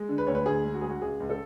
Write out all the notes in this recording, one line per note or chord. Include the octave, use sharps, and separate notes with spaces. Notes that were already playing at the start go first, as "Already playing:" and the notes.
Already playing: G#3
D3
B4
D2 C#5
B4
D2 G#4
G#3
F#4
G#3 G#4
F#4
C#2 G#4
C#2
A4